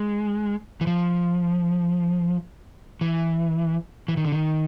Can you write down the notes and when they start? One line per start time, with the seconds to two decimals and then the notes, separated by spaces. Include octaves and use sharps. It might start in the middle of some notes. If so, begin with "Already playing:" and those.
Already playing: G#3
0.81 E3
0.87 F3
3.01 E3
4.08 E3
4.17 D#3
4.25 D3
4.32 D#3